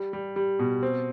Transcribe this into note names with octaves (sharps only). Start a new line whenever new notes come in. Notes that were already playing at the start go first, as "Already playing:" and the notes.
Already playing: G3
G3
G3
B2
C4